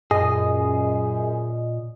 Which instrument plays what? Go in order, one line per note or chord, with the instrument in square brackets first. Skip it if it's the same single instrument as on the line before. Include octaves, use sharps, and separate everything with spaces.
[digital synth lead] F#2 [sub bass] A#2 [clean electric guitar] G#4 [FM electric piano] D#5